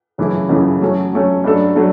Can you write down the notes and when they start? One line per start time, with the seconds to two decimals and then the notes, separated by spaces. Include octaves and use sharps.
0.18 F#2 C#3 E3 A3 E4
0.49 F#2 C#3 E3 A3 E4
0.81 F#3 A3 C#4
1.13 F#3 A3 C#4
1.44 G2 F#3 A3 D4 A4
1.76 F#3 A3 D4 A4